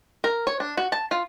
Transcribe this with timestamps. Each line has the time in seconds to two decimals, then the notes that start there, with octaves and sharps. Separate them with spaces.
0.24 A#4
0.47 C#5
0.60 D4
0.77 F#4
0.92 A5
1.11 F4